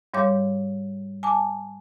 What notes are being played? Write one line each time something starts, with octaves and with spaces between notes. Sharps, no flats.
G#2 G3 C#5 F5 D6 G6
G#5 A5 D6